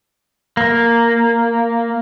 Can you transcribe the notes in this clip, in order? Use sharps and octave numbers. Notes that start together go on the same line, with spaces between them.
A#3